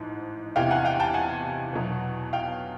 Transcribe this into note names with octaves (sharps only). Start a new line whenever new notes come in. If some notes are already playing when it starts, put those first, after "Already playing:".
Already playing: A1 G#2 F3
E2 C3 E3 F5 G5
F#5 G#5
F5 G5
G5 A5
F#5 G#5
E2 B2 F#3
F5 G5